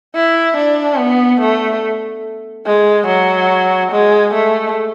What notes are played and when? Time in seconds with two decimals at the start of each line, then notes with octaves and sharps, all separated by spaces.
0.15 E4
0.57 D4
0.98 B3
1.40 A3
2.66 G#3
3.08 F#3
3.92 G#3
4.34 A3